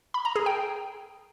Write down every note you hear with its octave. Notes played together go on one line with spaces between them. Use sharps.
B5
A#5
G#4
G5